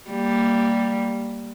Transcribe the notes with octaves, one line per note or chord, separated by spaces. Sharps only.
G3 A#3